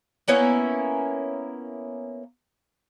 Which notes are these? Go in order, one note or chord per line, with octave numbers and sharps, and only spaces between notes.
A#3 B3 C#4 E4